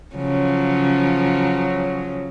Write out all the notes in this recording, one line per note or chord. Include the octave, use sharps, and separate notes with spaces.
C#3 F3 F#3